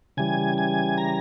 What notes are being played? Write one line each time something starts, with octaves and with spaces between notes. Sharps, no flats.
C#3 E3 G3 G#5
G#5
A#5